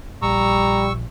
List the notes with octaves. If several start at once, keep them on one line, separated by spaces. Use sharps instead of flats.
A#1 G3 A#5 C#6 E6